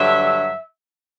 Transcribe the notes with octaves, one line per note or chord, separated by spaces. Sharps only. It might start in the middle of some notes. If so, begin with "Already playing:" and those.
Already playing: G2 D3 F#3 E5